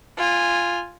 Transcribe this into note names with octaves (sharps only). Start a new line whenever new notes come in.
F4 G#5